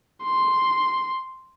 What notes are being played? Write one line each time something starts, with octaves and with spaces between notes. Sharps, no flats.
C6